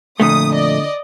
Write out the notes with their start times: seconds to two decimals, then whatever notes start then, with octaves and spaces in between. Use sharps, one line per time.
0.20 F2 A#2 D3 A3 D#6
0.53 D5 D#5